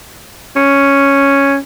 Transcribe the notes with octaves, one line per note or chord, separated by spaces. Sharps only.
C#4